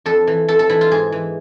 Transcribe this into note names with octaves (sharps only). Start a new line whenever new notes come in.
F2 A4
E3
F2 A4
A4
E3 E4
F4
G#2 G#4
E3